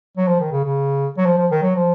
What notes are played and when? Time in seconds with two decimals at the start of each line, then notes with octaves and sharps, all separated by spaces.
0.17 F#3
0.28 F3
0.40 D#3
0.52 C#3
0.64 C#3
1.17 F#3
1.26 F3
1.38 F3
1.51 D#3
1.62 F#3
1.76 F3